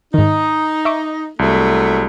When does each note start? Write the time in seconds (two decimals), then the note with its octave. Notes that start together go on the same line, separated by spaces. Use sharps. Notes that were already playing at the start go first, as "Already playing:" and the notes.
0.14 G#2 D#3 D#4
0.85 E5 C#6 D6
1.39 C2 F#3 G#3 A3